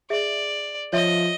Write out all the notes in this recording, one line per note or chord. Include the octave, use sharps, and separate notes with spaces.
G#4 D5 E5
F3 C#5 D#5 E5